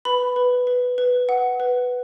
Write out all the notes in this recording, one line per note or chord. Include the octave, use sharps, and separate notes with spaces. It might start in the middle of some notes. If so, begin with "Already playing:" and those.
B4 B5
B4
B4
B4
F#5
B4